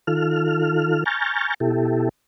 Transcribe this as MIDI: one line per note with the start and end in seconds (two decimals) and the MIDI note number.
0.07 1.04 51
0.07 1.04 65
0.07 1.04 69
0.07 1.04 89
1.06 1.54 80
1.06 1.54 82
1.06 1.54 85
1.06 1.54 89
1.06 1.54 91
1.06 1.54 93
1.60 2.09 47
1.60 2.09 64
1.60 2.09 67
1.60 2.09 69